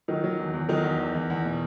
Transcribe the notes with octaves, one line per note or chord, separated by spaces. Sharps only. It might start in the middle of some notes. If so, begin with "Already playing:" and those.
D#3 F#3 D#4
F#3
E2
E2
D#3 F#3 D#4
E2
E2
E2
E2
B2